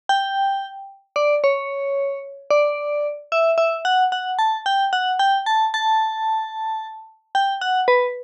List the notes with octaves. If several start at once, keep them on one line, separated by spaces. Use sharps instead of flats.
G5
D5
C#5
D5
E5
E5
F#5
F#5
A5
G5
F#5
G5
A5
A5
G5
F#5
B4